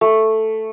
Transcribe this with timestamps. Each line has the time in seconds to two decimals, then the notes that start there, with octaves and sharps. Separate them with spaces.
0.01 A3